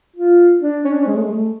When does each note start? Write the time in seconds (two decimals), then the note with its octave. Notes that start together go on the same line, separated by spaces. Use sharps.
0.16 F4
0.61 D4
0.85 C#4
0.91 D4
0.99 C#4
1.07 G#3
1.15 A3
1.22 G#3
1.31 A3